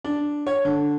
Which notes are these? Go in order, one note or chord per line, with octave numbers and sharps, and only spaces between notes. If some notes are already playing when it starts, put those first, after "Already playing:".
D4
C#5
D3